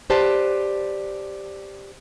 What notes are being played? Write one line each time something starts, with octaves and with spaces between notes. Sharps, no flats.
G4 B4 C5 D5 A5